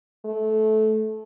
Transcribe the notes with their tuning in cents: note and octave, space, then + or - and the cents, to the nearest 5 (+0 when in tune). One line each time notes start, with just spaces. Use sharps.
A3 -20